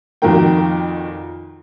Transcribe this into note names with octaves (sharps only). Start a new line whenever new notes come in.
F2 A#2 D#3 F#4 A#4 G5